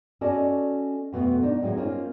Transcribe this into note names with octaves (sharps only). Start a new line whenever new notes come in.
C#4 F#4 A4 D5 D#5 A5
F2 B2 A3 B3
D4 D#4
D2 A2 F#3 G#3 D#4
A#3 C4 C#4 D#4 F4